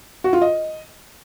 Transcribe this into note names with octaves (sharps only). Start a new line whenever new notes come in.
F#4
F4
D#5